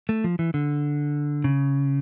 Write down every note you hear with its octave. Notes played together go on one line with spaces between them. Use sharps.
A3
F3
E3
D3
C#3